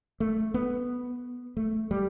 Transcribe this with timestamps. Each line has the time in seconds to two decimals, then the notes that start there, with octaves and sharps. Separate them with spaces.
0.20 A3
0.54 B3
1.57 A3
1.91 G3